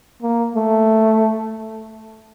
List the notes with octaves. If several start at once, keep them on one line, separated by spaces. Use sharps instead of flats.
A#3
A3